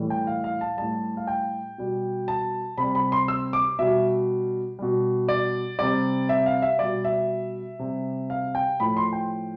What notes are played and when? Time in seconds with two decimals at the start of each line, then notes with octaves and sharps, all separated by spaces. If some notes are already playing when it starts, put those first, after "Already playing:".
Already playing: A2 E3 G3
0.10 G5
0.27 F5
0.44 F5
0.61 A5
0.77 A2 G3 A5
1.17 F5
1.27 G5
1.78 B2 G3
2.28 A5
2.78 C3 G3 B5
2.95 B5
3.12 C6
3.28 E6
3.53 D6
3.79 B2 G3 E5
4.79 B2 G3
5.29 D5
5.79 C3 G3 D5
6.29 E5
6.46 F5
6.62 E5
6.79 B2 G3 D5
7.05 E5
7.79 C3 G3
8.30 F5
8.55 G5
8.80 A2 F3 B5
8.97 C6
9.13 G5